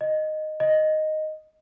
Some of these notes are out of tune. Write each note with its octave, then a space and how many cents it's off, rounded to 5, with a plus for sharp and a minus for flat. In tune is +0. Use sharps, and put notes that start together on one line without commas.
D#5 -5
D#5 +0